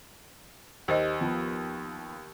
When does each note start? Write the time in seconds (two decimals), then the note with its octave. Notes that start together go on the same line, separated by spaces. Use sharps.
0.88 D#2 G4 C5 D#5
1.21 F3 B3